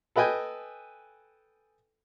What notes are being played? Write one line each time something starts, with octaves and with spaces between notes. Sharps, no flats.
A4 B4 D#5 G5 G#5